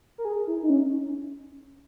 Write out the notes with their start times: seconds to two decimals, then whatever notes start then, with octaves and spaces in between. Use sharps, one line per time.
0.18 A#4
0.25 G#4
0.47 E4
0.63 D#4
0.70 C#4